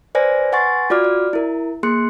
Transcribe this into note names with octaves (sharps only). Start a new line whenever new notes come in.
B4 C5 D5 G#5 A#6
B4 F#5 G#5 C6 C#6 A6
F4 F#4 D5 D6 F6
D5
E4 A#4
A#3 G#4 C6 F#6 C#7